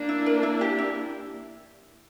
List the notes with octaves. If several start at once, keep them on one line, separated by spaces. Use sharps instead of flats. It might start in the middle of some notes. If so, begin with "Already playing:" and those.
Already playing: A#3 D4
E4
A#4
E4
G4
E4